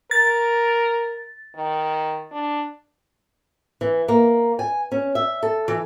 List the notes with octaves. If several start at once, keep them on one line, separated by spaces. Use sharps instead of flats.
A#4 A6
D#3
D4
E3
A#3
G#5
C#4
E5
A4
E3